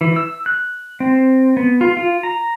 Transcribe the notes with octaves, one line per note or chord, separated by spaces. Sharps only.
E3
E6
F#6
C4
B3
F4
F4
A#5